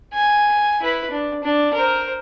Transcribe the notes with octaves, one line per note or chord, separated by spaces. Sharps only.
G#5
E4 B4
D4
D4
A#4 C5